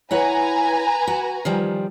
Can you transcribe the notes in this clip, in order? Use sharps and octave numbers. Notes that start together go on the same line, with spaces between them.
E4 B4 C#5 F#5 G#5 A#5
F#4
D#3 F3 G3